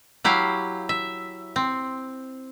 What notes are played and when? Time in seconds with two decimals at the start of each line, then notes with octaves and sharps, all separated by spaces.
0.24 F#3 E4 G4 F5
0.89 E5
1.56 C4